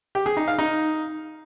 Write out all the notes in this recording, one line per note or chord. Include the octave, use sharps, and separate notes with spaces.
G4
G#4
D#4
F5
D#4